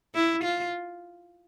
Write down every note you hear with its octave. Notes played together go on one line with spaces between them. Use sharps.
E4
F4